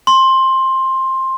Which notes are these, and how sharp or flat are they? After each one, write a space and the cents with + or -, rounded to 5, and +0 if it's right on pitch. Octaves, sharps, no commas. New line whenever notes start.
C6 +15